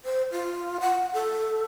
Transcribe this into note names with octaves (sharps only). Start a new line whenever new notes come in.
C5
F4
F#5
A4